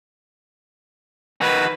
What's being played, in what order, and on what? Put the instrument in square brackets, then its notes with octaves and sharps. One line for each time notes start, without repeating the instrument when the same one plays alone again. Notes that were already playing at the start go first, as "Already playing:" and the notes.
[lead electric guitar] D#3 F#4 [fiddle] B4